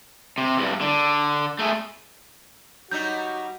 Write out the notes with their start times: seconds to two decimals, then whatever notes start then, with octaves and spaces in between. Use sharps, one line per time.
0.38 C3
0.57 E2 G2
0.81 D3
1.59 A3 G#4
2.91 F#3 G3 D#4 F#4 G6